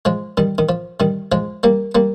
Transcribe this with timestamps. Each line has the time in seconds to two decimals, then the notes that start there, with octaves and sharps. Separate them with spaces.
0.05 F3 G#3
0.37 D#3 G3
0.58 D#3
0.69 F3
1.00 D#3 G3
1.32 F3 G#3
1.63 G3 A#3
1.95 G3 A#3